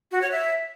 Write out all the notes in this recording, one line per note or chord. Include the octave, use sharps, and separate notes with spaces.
F#4
C#5
E5